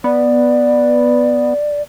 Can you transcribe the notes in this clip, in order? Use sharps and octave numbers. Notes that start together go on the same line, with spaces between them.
B3 D5